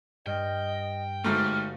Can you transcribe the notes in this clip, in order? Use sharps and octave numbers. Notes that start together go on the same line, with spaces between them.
G2 D#5 G5 F6
G1 G#2 G3 A3 F#4 F5 F6